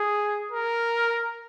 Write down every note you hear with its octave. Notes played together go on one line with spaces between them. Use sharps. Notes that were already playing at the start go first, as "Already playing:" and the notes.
Already playing: G#4
A#4